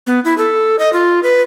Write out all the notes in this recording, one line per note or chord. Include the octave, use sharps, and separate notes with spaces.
B3
E4
A4
D#5
F4
B4